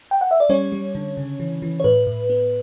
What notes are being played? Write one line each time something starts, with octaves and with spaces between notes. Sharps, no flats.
G5
F#5
E5
D5
G3 C#4 C#5
G3
D3
C#3
E3
E3
C#5
A2 B4
A2
B3